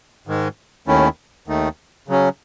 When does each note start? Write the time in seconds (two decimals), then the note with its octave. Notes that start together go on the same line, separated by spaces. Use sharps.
0.27 G#2 D#3 G#3
0.87 D#2 D#3 A3 C#4 E4
1.48 D#2 D#3 A3 D#4
2.08 C#3 F#3 C#4